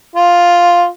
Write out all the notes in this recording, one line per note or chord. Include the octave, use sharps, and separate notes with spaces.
F4